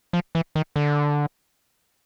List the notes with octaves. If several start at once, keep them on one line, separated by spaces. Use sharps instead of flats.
F3
E3
D#3
D3